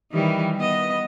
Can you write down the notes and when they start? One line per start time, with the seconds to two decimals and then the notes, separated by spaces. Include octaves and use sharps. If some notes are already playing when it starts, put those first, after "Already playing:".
0.12 D#3 E3 G3
0.58 B3 D#5